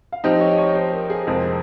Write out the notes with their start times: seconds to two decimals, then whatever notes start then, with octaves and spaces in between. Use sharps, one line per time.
0.12 F5
0.24 F3 C4 D#4 G4 D#5
0.41 C#5
0.51 D#5
0.58 C#5
0.75 C5
0.93 A#4
1.10 G#4
1.27 F2 C3 F3 G#3 C4 A#4